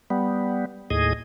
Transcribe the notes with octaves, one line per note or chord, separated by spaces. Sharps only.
G3 B3
D#2 A2 G#4 D#5